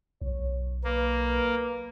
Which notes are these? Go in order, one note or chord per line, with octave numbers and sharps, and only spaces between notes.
B1 C#5
A#3 B4